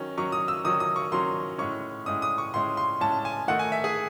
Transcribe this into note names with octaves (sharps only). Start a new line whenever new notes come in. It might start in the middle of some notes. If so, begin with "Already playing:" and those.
Already playing: D#3 F#3 C#4
D#3 F#3 C#4 C#6
D#6
E6
D#3 F#3 C#4 D#6
D#6
C#6
D#3 F#3 C#4 C6
A2 G#3 C#4 C#6
A2 G#3 C#4 D#6
D#6
C#6
A2 G#3 C#4 C6
C6
A2 G#3 C#4 A5
G#5
D#3 A3 D#4 F#5
G#5
E5
G#4